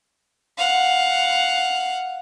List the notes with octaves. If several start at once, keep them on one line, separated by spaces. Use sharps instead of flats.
F5 F#5